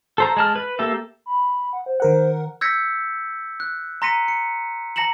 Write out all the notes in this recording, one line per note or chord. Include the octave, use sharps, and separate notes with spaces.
A4 C5 A#5
G#3 A5 F6
B4
A#3 G4 A4 E5
B5
F#5
C5
D#3 A#4 C5 F#5
E6 G6 G#6 A#6 B6 C#7
F#6
A#5 C6 A#6 B6 C#7 D#7
C#7
A5 A#5 A#6 C#7 E7 F#7